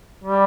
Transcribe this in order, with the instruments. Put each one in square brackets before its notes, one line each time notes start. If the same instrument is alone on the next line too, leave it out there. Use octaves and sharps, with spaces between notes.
[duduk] G3